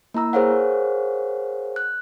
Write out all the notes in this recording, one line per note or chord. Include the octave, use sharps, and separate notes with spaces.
A#3 E4 A#5 E6
G#4 A#4 C5 C#5 F5 F#5
F#6